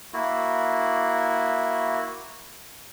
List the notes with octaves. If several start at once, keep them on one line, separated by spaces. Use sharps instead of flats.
A#3 E4 F#4